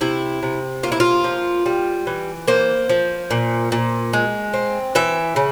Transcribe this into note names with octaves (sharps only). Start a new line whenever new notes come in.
C3 E4
C3
A#3 F4
E4
F4
F3
G3
E3
A#3 C5
F3
A#2
A#2
G#3
C4
E3 E5
C#3